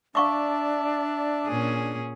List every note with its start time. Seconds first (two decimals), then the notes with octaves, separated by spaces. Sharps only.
0.15 D4 D5 E5 F5 A5 C#6 D6
1.46 A#2 C#4 G#4